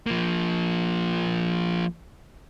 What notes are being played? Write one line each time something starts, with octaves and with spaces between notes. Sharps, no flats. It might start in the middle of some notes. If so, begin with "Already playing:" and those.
F3 A#3